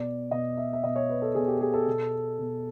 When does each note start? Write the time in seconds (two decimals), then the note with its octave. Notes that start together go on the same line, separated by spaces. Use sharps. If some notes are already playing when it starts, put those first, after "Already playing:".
Already playing: B2 D5
0.31 B2 D#5
0.57 E5
0.73 E5
0.83 B2 D#5
0.96 C#5
1.09 B4
1.22 A4
1.35 B2 G#4
1.48 G4
1.61 G#4
1.74 A4
1.87 B2
2.39 B2